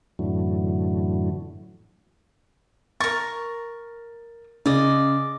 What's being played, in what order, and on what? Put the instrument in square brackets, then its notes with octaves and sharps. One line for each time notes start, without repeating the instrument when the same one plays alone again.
[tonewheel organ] F#2 A2 D3 E3 F#3
[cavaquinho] A#4 C#6 [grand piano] A6
[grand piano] C#3 [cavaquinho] D5 D#5